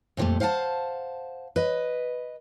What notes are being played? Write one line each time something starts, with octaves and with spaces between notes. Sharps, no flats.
F2 A#2 E3 G3 A3
C5 F5 F#5 G#5 A5
B4 D#5